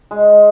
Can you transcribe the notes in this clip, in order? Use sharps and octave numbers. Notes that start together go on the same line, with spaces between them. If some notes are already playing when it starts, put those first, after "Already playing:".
G#3